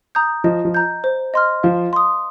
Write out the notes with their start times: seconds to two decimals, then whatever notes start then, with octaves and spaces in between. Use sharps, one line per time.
0.15 A#5 D#6 G6
0.44 F3 D#5
0.65 F3
0.74 A#5 G6
1.04 C5
1.34 D#5 C6 F6
1.63 F3 F5
1.93 C6 D#6